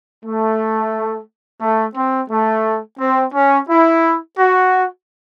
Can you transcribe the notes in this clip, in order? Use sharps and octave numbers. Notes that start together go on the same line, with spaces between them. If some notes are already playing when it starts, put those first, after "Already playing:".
A3
A3
C4
A3
C4
C#4
E4
F#4